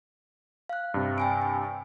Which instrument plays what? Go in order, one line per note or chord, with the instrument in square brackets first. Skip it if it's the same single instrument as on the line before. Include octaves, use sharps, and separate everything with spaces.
[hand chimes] F5 F#6
[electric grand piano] G2 C3
[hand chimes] G5 G#5 D7
G5